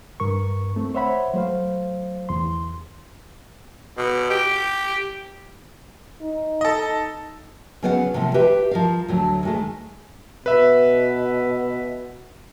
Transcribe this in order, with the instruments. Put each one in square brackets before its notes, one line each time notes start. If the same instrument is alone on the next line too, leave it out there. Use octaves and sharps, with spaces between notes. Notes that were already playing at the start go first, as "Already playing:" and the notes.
[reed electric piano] G2 A#4 C#6
A3 C4
C5 C#5 E5 F#5 B5
F#3 A3 C5 F5
E2 C6
[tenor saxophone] B2
G4
[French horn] D#4
[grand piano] A4 D#5
[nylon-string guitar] C#3 F#3 B3 F5 F#5
A2 C3 D#3 F3 A3
G4 B4 E5 F5
F3 A#4 F5
D2 F#3 A3
D#3 G#3 A3
[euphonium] B2 [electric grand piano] B4 E5